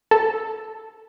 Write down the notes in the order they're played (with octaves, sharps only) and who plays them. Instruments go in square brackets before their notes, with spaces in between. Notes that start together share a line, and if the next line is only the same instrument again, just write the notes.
[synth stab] A4